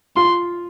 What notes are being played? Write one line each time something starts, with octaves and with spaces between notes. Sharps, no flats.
F4 C6